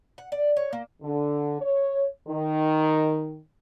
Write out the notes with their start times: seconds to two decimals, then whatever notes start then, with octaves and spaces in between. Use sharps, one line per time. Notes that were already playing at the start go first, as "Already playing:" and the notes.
0.18 F#5
0.32 D5
0.57 C#5
0.73 A#3
1.02 D3
1.61 C#5
2.27 D#3